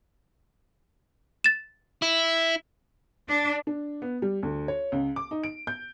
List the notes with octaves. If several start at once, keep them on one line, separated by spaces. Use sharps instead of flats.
A6 E7
E4
D4
D4
B3
G3
D2
C#5
C#2
D6
D#4
D7
G6